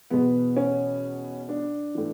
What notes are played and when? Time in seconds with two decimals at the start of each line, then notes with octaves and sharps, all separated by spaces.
0.10 E2 B2 B3
0.57 C#4
1.49 D4
1.95 A2 E3